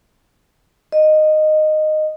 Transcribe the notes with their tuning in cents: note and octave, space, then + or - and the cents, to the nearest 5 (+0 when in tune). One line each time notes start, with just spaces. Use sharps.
D#5 -10